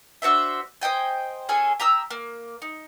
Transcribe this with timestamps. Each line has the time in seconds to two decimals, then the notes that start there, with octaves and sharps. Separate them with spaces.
0.22 D4 F#4 C5 E5
0.81 C5 D#5 G5 G#5
1.49 C#4 G#4 A4 G#5
1.80 G4 A#5 D#6 E6
2.10 A#3
2.62 D#4